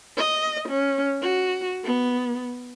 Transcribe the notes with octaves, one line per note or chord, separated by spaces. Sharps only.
D#5
C#4
F#4
B3